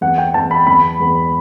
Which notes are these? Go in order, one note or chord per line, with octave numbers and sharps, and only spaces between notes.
E2 F#5
G5
E2 A5
B5
E2 B5
E2